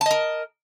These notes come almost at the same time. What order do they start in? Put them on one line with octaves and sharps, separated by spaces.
A5 D#5 A#4